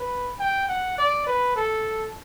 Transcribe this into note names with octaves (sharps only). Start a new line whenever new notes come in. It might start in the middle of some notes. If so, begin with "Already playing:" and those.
Already playing: B4
G5
F#5
D5
B4
A4